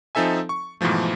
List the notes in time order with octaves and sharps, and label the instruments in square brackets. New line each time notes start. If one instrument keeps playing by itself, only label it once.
[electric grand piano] F3 C4 D#4 A4 E5 G#5
C#6
G#2 B2 E3 F3 A3